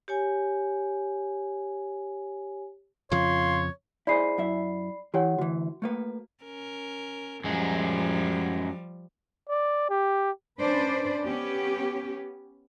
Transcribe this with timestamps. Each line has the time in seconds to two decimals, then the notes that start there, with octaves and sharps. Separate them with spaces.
0.08 G4 C#5 G#5
3.12 F2 C#3 F3 F4 C#5 C6
4.07 E4 G#4 C5 D5 B5 C7
4.38 F#2 E4 E5
5.14 E3 E4 G4 C#5 F#5 G5
5.39 D2 E3 F#4
5.82 A3 A#3 B4
6.44 C#4 A#4
7.44 F#2 F3 G3 G#3
9.49 D5
9.90 G4
10.59 C#4 D4 B4 C5 D5
11.24 B3 C#4 G4